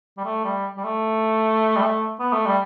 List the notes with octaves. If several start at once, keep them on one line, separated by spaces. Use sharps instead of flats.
G3
A3
G3
G3
A3
G3
A3
B3
A3
G3